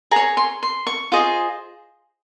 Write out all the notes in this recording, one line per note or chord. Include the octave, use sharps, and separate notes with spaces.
G#4 C#5 A#5
C6
C6
C#6
F4 G#4 C5 D#5